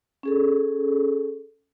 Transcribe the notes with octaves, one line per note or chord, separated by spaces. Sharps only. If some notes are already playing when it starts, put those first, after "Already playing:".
C#4 G#4 A4